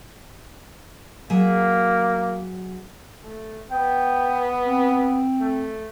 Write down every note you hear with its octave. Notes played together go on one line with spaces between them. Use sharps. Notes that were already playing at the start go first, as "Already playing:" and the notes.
F#3 A#3 G#4 E5
A3
B3 G5
C4
A3